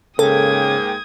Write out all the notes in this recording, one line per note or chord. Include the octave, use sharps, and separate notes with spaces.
G#2 C#3 A#3 A4 G5 D#6 G#6